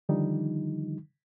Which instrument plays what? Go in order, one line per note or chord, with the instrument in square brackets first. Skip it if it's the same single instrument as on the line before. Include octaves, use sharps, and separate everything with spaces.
[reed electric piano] D3 D#3 F3 G3 D#4